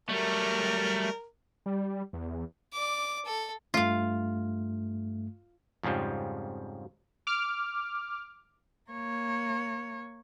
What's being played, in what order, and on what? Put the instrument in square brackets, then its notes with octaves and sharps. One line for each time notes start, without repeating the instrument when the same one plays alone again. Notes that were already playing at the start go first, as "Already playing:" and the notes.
[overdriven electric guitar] F#3 G3 [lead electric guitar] A3 [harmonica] A#4
[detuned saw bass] G3
E2
[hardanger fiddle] D5 D6
A4
[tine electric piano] G2 A3 [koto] F4 F5
[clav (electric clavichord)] F2 G#2 C#3 F3 G3
[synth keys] D6 F6
[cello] A#3 C#5